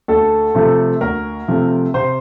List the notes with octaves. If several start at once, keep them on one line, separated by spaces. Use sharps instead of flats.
D2 A4
C3 F3 A3 C4
D2 A#4
C3 F3 A3 C4
C3 C5